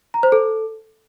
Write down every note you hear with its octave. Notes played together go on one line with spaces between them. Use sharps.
A#5
C5
A4